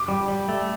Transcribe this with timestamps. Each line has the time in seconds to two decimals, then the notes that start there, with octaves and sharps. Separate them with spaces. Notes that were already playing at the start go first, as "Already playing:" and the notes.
Already playing: D6
0.08 G3
0.28 G3
0.48 A3